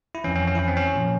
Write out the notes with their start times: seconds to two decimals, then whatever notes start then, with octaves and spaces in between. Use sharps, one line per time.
0.15 E4
0.24 E3 C#4
0.27 F2
0.36 C#4
0.47 C#4
0.55 E4
0.59 C#4
0.68 C4
0.77 C#4
0.94 A#2 F3